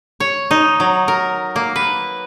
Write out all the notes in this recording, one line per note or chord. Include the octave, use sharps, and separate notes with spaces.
C#5
D#4
F#3
A#4
A#3
B4